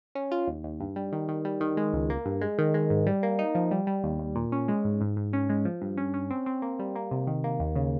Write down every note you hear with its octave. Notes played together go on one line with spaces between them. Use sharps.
C#4
F4
D#2
D#2
G2
G3
D#3
D#3
G3
D#3
G#3
C#2
A#3
G2
G#3
D#3
G#3
G#2
G3
A#3
D#4
F3
G3
G3
D#2
D#2
A#2
C#4
G#3
G#2
G#2
G#2
C#4
G#3
F3
G2
C#4
C#4
C4
C4
A#3
G3
A#3
C3
D#3
A#3
D#2
C#3